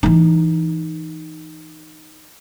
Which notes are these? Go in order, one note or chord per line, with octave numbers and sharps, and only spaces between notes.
E3 D#4